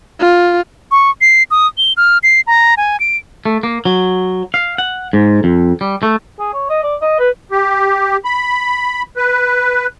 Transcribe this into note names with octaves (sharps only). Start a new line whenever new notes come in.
F4
C#6
C7
D#6
G7
F6
C7
A#5
G#5
D7
A3
A#3
F#3
F5
F#5
G#2
F2
G3
A3
G#4
C#5
D#5
D5
D#5
B4
G4
B5
B4